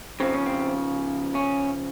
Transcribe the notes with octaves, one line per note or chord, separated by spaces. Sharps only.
C#3 F3 C4
C#4
C4
C#4